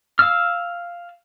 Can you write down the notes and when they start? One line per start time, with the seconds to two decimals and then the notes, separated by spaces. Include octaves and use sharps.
0.19 F5 E6 F6